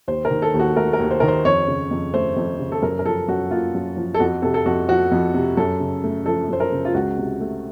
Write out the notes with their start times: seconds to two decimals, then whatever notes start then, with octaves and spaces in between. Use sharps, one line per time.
0.08 D#2 C5
0.25 A#4
0.30 D#3
0.42 A4
0.54 D#2
0.59 F#4
0.76 A3 A#4
0.93 A#4
0.99 D#2
1.11 C5
1.20 D#3 A#4
1.28 C5
1.45 F2 C#5
1.68 C#3
1.91 F2
2.14 A3 C5
2.36 F2
2.59 C#3
2.72 A4
2.82 F#2 A#4
2.99 A#4
3.06 F3 A4
3.28 F#2 F#4
3.51 A#3 F4
3.74 F#2
3.97 F3
4.14 A4
4.20 F2 F#4
4.42 C3 A4
4.54 A4
4.66 F2 F#4
4.88 F3 F#4
5.11 F2
5.34 C3
5.57 F#2 A4
5.80 C#3
6.04 A3
6.26 F3 A4
6.49 F#2 C5
6.60 A#4
6.72 C#3
6.85 F4
6.94 C#2 F#4
7.18 C3
7.40 A3